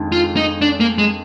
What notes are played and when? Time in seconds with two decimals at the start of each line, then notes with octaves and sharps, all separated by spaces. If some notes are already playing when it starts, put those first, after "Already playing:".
Already playing: F2 D#3 G#3 D4
0.12 F4
0.37 D#4
0.62 D4
0.80 A#3
0.98 G#3